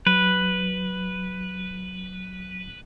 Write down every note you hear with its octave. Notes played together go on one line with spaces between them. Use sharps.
F#3 B4